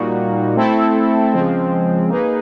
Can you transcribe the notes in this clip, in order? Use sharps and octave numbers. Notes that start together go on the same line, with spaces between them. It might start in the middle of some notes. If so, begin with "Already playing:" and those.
Already playing: A#2 G3 A#3 D#4 F#4
A3 C4 E4 A4
C#3 F3 G#3 C4
A#3 D#4 G#4 B4